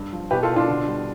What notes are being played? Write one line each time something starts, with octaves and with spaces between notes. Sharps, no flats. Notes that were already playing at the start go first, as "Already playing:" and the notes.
Already playing: G2
F3
B2 G4 B4
F4 A4
B2
D4 F4
D3
G3